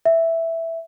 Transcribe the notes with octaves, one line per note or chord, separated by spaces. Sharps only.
E5